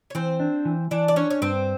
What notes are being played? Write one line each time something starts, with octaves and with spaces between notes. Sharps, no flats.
C#5
E3 C4 C5
D4
E3
E3 D4 D5
D5
C#4 D4 C#5
C#5
G2 C4 C5